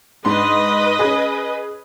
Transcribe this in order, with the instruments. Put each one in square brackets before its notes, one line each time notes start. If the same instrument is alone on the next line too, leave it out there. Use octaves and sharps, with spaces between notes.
[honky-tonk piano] G#2 D4 C6 [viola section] B4 D#5
[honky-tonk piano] C#4 G#4